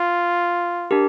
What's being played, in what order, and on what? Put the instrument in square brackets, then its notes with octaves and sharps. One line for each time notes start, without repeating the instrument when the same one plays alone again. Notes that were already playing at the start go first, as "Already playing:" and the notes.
Already playing: [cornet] F4
[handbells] D4 G4 A#4